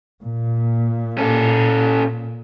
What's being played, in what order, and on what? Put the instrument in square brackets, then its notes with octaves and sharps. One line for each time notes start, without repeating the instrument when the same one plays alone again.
[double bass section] A#2
[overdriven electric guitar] C#4 A4